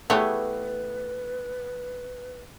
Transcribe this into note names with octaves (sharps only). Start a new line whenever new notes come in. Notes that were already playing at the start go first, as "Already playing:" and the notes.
E3 A3 B3 G4 G#4 B4 C#5